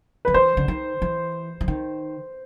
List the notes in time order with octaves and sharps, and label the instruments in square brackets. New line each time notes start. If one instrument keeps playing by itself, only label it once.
[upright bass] D#3 [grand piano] B4
[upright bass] E3 [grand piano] C5
[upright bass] D3
D#3
E3
E3
D#3